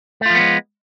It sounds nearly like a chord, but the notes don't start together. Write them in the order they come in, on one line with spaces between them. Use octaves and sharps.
A3 F4 F3 B3 G#3